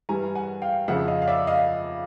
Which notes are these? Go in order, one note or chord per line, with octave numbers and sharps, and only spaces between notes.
G2 E3 G3 G#5 A#5
F#5 G#5
F5 G5
F2 C#3 F3 E5 F#5
D#5 F5
F5
D5 E5
D#5 F5